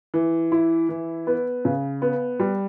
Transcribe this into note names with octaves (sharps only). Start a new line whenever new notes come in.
E3
E4
E3
B3
C#3
B3
G3